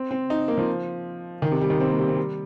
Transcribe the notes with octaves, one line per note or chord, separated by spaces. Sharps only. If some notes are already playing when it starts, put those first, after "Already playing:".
Already playing: C4
C4
D#4
A#3
F3
D#3
C3
G3
D#3
C4
A#3
G3
C4
G3